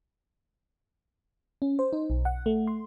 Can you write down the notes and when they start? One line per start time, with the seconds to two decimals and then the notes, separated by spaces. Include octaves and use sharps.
1.62 C#4
1.79 C5
1.93 D#4
2.10 B1
2.25 F#5
2.46 A3
2.67 C6